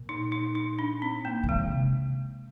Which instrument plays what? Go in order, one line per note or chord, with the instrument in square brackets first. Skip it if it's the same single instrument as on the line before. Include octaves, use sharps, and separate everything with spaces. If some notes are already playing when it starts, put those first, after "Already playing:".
Already playing: [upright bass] A#2
[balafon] D#4
D#4
D#4
D4
C4
A#3
[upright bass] D#3
[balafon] G#3
[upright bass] D3
C3